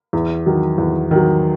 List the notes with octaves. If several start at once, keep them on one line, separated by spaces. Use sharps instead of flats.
E2
D#3 F#3
E2
D#3 F#3